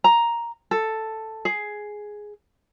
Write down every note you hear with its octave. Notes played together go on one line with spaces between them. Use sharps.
A#5
A4
G#4